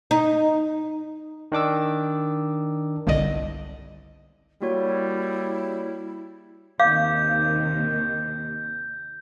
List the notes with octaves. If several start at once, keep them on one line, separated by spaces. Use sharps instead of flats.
D#4
D#3 D4 D6 E6
G1 C2 D3 D5 D#5
G3 A#3 E4 F#4 C#5
D#2 C3 D#3 F5 D6 G6